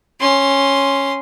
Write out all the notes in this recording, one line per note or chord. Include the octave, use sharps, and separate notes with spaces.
C#4 C6